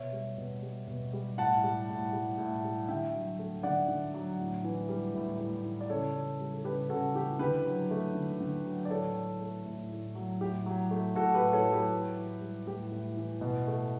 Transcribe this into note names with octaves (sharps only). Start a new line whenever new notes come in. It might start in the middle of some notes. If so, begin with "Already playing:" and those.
Already playing: B2 C#5 E5
G3
B2
G3
B2
G3
A2 F#5 A5
G3
A2
G3
A2
G3
D3 E5 G5
F#3
A3
D3 D5 F#5
D3
F#3
A2
E3
G3
A2
A2
E3
D5
C#3 A4 C#5
E3
G3
A4
C#3 G4 B4
C#3 F#4 A4
E3 G4
D3 G4 B4
F#3
A3
D3
D3
F#3
D5
A2 A4 C#5
F#3
A3
A2
A2
F#3
A2 G4
F#3
A3
A2 F#4 A4
G4 B4
A2
A4 C#5
F#3
G4 B4
A2
E3
G3
A2 G4
A2
E3
B2
A3